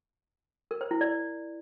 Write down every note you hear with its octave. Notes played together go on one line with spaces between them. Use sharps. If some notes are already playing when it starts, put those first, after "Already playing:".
A#4
C5
E4
D5